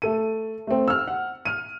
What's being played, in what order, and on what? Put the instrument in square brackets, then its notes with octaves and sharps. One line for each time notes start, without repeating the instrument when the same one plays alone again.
[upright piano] A3 A4 D#7
A3 C4
E6 F6
F#5
F6 D#7